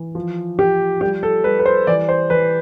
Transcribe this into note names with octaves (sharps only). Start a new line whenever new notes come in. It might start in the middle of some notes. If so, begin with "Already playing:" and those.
Already playing: E3
F3
F3 G4
G3 G4
A4
G3 B4
B4
C5
E3 D5
C5
E3 B4